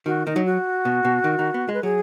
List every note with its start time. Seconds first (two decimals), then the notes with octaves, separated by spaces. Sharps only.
0.06 D#3 F#4
0.26 D#3 D#4
0.36 F#3
0.45 F#4
0.85 B2
1.05 B2
1.24 D#3
1.39 D#3
1.54 B3
1.69 G#3
1.74 B4
1.83 F#3 G#4